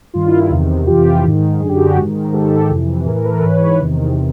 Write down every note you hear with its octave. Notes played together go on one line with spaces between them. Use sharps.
G2 D#3 F4
E4
F4
E2 C3 D#3
F2 C3 E3 F4 G4
G#2 D#3
F#2 D3 G#4
G4
F#4 G#4
G#2 D#3
A#4
G#2 D#3 G4 A4
F2 C3 E3
A2 E3 G#4 A#4
A#4
A4 B4
G#2 E3 B4 C#5
E2 C3 D#3